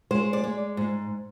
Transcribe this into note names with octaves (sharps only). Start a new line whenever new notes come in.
G#3 C5
D5
G#3
G#2